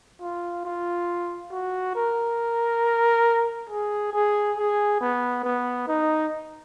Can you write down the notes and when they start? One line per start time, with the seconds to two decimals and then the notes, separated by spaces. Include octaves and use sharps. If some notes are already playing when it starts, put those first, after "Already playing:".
0.21 F4
0.65 F4
1.52 F#4
1.95 A#4
3.69 G#4
4.13 G#4
4.57 G#4
5.01 B3
5.44 B3
5.87 D#4